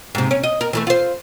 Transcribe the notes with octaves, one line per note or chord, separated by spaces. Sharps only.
G#2 C3
C#4
D#5
A#4
E3 G3 A3
F4 C5